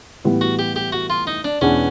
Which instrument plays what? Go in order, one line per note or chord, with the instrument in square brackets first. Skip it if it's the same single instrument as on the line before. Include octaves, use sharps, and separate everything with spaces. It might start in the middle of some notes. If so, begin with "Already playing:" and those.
[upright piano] A2 E3 G3 B3
[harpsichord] F#4
G4
G4
F#4
F4
D#4
D4
[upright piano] E2 B2 G#3 B3 D4 [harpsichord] C#4